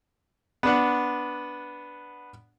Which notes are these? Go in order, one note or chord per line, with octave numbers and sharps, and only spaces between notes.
B3 D4 F#5